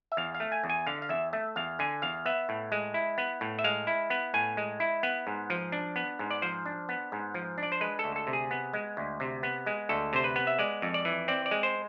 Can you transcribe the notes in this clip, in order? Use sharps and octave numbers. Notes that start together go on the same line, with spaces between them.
E5
E2 F5
F5
A3
G#5
E2
G#5
D3 F5
F5
E2 E5
A3 E5
E2 F5
D3 G#5
E2 F5
B3 E5
A2
G#3
E4
B3
A2
E5
G#3 F5
E4
B3
A2 G#5
G#3
E4
B3
G#2
F3
D4
B3
G#2
D5
F3 C5
D4
B3
G#2
F3
D4
D5
C5
G#3 B4
A4
D2
A4
C3
G#4
B3
G#3
D2
C3
B3
G#3
D2 A4
C3 C5
B4
B3
E5
G#3 D5
F2
D5
E3
C4 D5
D5
G#3
C5